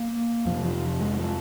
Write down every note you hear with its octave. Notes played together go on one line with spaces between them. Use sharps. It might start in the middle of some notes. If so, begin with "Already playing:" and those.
Already playing: A#3
F2 C3 F3
F3
G#3
F3